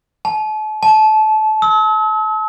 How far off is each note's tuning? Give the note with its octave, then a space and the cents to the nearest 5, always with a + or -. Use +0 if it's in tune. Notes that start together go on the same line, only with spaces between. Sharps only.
A5 -40
A5 -25
E6 -45